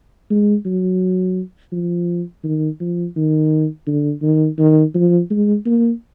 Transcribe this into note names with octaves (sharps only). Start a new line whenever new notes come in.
G#3
F#3
F3
D#3
F3
D#3
D3
D#3
D#3
F3
G#3
A#3